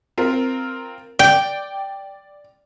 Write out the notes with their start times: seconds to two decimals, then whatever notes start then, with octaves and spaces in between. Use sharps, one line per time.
0.18 C4 F4 A#4
1.19 D5 G5